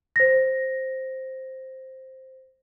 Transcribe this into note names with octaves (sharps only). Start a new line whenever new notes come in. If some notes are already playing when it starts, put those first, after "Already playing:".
C5 A#6